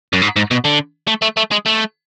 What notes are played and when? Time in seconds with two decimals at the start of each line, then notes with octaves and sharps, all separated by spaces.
0.13 F#2
0.22 G#2
0.36 G#2
0.51 B2
0.65 D3
1.07 A3
1.22 A3
1.37 A3
1.51 G#3
1.66 A3